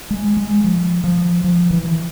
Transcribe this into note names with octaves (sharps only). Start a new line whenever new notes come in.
G#3
G#3
F3
F3
F3
E3